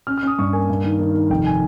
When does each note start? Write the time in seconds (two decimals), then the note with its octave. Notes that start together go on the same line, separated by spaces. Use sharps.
0.07 C#4 F6
0.18 F6
0.23 C#4 D#6
0.39 G2 C#6
0.53 A#3 G#5
0.69 G2
0.84 D#3
0.99 D#3
1.14 D#3
1.30 F1 G5
1.46 G#5